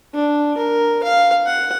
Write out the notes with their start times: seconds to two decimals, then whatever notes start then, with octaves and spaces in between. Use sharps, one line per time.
0.14 D4
0.57 A#4
1.04 F5
1.46 F#5